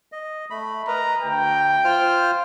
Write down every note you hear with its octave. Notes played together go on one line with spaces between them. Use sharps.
D#5
A3 B5
A#4 B4 D#5 A#5
D2 G5
F4 C5 F6